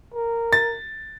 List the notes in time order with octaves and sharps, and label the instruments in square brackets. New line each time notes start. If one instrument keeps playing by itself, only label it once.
[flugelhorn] A#4
[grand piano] A6